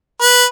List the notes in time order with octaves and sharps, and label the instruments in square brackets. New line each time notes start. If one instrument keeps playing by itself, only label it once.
[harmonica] B4